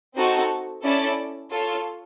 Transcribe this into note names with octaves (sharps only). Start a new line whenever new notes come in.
C4 D#4 F#4 A4
C#4 E4 A4 D5
F4 A4 C#5